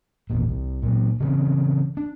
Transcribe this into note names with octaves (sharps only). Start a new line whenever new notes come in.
G#1 E2 A#2
C2
A#2 F#3
C#3 E3 C4 C#4
D4